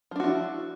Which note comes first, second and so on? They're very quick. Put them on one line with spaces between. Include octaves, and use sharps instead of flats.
F3 D4 F#4 E4